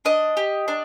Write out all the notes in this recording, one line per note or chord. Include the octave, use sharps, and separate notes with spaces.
D4 D#5
G4
D4